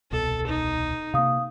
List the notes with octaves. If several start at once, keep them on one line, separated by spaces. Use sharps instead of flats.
D#1 C2 B2 A4
D#4
C3 A#3 F5 D#6